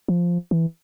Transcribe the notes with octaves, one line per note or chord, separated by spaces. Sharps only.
F3
E3